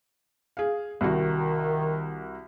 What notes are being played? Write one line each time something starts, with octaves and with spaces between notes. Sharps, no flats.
G#4 F5
C2 D#3 F#4